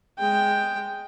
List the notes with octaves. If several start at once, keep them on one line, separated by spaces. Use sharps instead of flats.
G#3 G5